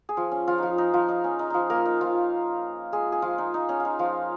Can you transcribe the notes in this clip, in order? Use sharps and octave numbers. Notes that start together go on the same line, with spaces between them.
G#4
F3 F4
C#4
F3 F4
F3 D#4 F4
D#4
F3 F4
D#4
C#4
D#4
F3 D#4 F4
A#3 A#4
D#4
F3 F4
G#3 G#4
G#4
F3 F4
D#4
D#4
C#4
D#4 F4
F3 F4